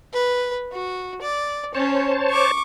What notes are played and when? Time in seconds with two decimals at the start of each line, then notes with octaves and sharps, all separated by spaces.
0.13 B4
0.72 F#4
1.21 D5
1.75 C#4 C5 C#5 A5
2.30 C#6 D6